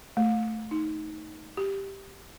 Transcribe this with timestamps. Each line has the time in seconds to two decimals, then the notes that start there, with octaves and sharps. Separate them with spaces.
0.17 A3
0.71 D#4
1.57 G4